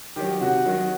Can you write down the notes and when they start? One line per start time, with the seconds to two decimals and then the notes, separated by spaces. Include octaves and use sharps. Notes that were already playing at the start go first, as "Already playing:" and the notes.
0.16 D#3 F#3 G4
0.41 C3 F#4
0.66 D#3 F#3